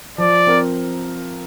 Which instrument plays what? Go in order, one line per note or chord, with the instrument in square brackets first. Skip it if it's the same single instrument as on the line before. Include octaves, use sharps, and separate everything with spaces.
[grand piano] F3 [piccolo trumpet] D5
[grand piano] C4 A#4